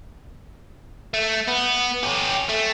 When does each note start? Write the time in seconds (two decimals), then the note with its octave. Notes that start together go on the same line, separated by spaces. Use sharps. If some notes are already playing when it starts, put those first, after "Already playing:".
1.14 A3
1.48 B3
2.03 C#4 G4
2.49 A3